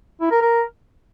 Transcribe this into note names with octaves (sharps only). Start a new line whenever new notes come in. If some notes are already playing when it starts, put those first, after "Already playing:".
E4
A#4
A#4